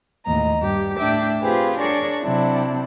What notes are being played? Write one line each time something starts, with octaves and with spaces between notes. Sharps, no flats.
D#2 A2 D#5 A#5
G2 G4
A2 D4 E5 G5 D6
C4 F4 G4 G#4 B4 C5
D4 G#4 A#4 C#5 D5 C#6
C3 F#3 C4 D4 E4